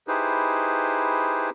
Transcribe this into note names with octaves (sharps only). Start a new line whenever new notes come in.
D#4 E4 G4 G#4 B4 C5